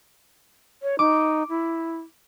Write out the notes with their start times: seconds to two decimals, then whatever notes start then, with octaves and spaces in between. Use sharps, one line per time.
0.82 C#5
0.99 D#4 D6
1.49 E4